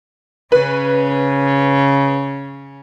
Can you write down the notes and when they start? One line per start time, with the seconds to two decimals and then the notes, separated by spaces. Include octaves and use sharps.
0.52 C#3 C#4 B4